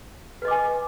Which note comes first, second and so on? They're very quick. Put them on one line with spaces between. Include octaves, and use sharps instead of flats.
B4 D#5 D6 G#5